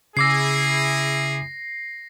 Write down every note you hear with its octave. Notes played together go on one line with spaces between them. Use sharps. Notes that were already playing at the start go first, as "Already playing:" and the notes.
C#3 E4 G#4 D6 E6 A#6 C7